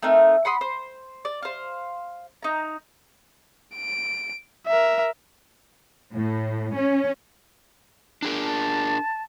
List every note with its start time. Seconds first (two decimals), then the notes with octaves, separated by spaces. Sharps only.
0.03 A3 C4 D#4 A#4
0.45 F#5 B5 C6 D#6
0.61 C5
1.25 D5
1.43 C5 F5
2.43 D#4 A#5
3.76 D7
4.67 A#4 E5
6.14 A2
6.76 C#4
8.22 D4 G#4 A#4
8.43 A5